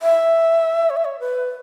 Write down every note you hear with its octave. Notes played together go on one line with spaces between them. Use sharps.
E5
C#5
E5
C#5
B4